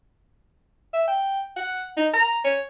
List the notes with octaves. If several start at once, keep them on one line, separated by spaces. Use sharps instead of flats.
E5
G5
F#5
D#4
A#5
C#5